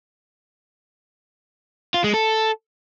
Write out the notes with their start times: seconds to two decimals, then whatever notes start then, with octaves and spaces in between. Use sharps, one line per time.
1.94 F4
2.04 G#3
2.14 A4